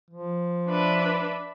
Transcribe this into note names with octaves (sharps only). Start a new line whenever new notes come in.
F3
D4 B4 E5